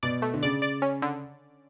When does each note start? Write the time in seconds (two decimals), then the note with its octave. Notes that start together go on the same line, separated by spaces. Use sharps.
0.03 B2 D5
0.22 A3
0.34 D3
0.43 C#3 D5
0.62 D5
0.82 C#4
1.02 D3